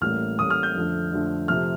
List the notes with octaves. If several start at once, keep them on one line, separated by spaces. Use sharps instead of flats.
A1 A2 G3 A#3 F6
A1 A2 G3 A#3 D#6
F6
G6
F2 D3 F3 A3
F2 D3 F3 A3
C3 F3 A3 F6